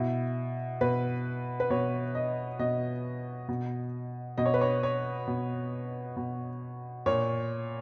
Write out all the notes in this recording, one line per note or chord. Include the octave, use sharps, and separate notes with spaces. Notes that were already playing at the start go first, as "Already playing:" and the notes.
Already playing: B2 E4
B2 B4
B4
B2 C#5
D#5
B2 D#5
B2
B2 D#5
C#5
B4
C#5
C#5
B2
B2
A#2 C#5